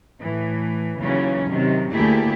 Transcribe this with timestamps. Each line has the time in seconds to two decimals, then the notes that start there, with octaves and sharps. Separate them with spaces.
0.21 A2 E3
0.98 D#2 C#3 E3 F#3 C#4
1.49 C3 D#3 F#3
1.91 D2 A3 A#3 E4 G4 G#4